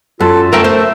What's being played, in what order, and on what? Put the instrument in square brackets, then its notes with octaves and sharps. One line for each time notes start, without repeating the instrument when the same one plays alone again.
[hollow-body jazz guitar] F#2 [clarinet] F4 [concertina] A4
[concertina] A3 [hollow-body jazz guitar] A#4 E5 G5 [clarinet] E6
[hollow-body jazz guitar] C5